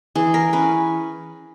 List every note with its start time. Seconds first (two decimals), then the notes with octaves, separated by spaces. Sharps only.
0.15 E3 G#4
0.34 A#4
0.53 C#4 B4